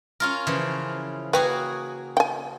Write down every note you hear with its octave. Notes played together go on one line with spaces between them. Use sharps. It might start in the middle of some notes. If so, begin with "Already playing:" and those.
C#4 F4 A#4
C#3 E3 F3
A#3 F#4 G#4 B4 G5
G5 G#5